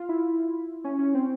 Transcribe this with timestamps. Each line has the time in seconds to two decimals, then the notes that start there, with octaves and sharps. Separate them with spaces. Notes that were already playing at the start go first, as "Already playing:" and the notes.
Already playing: F4
0.09 E4
0.84 C#4
0.99 C#4
1.14 C4